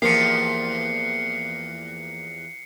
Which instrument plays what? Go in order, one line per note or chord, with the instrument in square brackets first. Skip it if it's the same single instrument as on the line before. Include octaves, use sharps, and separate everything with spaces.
[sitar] E2 F3 G4 [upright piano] A#3 [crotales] C7 C#7